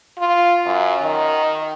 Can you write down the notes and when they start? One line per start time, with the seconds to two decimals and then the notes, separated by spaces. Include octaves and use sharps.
0.18 F4
0.66 F#2
1.02 D#3